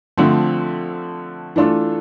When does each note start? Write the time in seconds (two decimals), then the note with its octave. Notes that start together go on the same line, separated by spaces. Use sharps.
0.17 D3 F3 A3 C4
1.56 E3 A3 D4 F4 A4